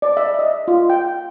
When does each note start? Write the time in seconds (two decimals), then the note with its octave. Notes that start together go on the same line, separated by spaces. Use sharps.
0.02 D5
0.17 E5
0.39 D#5
0.68 F4
0.90 G5